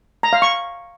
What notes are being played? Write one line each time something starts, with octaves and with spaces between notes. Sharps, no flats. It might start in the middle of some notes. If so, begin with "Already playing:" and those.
A#5
F5
C#6